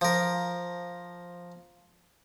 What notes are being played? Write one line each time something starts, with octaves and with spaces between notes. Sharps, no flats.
F3 A#4